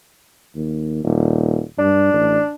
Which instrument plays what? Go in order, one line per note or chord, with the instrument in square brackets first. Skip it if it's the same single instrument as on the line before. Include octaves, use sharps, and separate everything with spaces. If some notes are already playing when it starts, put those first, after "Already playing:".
[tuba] D#2
D#1
[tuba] G2 [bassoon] D4
[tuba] A1